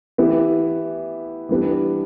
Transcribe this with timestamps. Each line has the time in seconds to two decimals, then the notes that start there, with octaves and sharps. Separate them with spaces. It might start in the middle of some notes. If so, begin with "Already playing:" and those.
0.18 E3 B3 E4 G4
1.49 E3 G3 B3 D4 G4